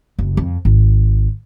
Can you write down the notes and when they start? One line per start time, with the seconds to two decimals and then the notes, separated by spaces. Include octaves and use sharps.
0.19 F#1
0.37 F2
0.65 G#1